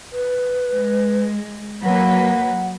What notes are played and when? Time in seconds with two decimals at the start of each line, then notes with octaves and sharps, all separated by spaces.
0.12 B4
0.71 G#3
1.84 F#3 A#3 B4 F#5